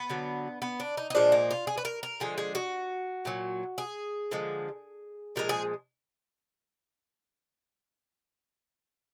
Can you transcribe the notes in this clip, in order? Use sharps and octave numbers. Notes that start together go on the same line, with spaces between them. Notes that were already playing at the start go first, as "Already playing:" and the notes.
Already playing: B3
D3 F#3
B3
D4
D#4
D#4
A#2 F3 G#3 D4
A#3
F4
G#4
B4
A#4
A#4
D3 F3 G#3 G#4
G#4
F#4
A#2 F#3
G#4
D3 F3 G#3
A#2 F3 G#3 A#4
G#4